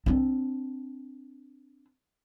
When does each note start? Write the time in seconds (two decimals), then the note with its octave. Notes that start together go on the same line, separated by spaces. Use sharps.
0.06 C4 D4